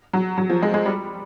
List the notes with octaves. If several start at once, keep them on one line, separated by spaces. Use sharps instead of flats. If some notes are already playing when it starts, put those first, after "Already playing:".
F#3
F#3
F3
G#3
G#3
G3